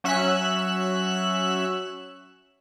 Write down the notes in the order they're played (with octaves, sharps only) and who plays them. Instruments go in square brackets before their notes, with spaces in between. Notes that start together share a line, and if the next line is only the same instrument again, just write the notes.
[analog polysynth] F#3 C#4 E5 E6 F#6